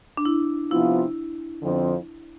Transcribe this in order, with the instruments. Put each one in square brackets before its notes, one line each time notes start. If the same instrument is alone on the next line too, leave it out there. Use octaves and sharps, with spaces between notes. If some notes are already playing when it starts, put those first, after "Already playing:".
[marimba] D4
E4
[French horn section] C3 F3 B3 F4 [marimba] E4
[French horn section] F2 D3 F3 C4